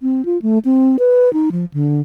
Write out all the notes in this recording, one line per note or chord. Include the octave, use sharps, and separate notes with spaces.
C4
F4
A3
C4
B4
D#4
F3
D3